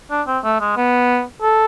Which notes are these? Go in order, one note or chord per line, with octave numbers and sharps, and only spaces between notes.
D4
C4
A3
G#3
B3
A4